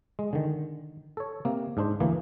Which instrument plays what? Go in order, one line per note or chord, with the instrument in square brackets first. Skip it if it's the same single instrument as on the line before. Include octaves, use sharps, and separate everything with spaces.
[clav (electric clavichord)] G#3
D3 D#3
A4 C#5
C3 A#3
G#2 D4 C5
D2 E3 A#3